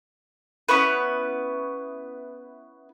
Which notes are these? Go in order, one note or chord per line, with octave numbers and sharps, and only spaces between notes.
B3 C#4 E4 B4